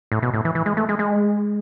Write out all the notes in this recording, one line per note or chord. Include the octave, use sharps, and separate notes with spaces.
A2
B2
A2
E3
E3
G#3
A3
G#3
G#3